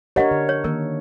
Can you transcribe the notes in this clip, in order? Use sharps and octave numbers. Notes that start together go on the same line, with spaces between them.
D4 G4 A#4 C#5 D#5 F#5
D3
C#5
D#3 A#3 A#4